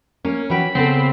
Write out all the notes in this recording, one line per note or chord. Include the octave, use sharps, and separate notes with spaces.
A#3 C#4
E3 F#4 G5 B5
C#3 B3 C4 A4